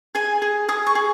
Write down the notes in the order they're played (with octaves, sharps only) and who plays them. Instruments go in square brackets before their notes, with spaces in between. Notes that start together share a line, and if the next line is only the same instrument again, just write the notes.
[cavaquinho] G#4 G#5
G#4
G#4 D#6
C#6
G#4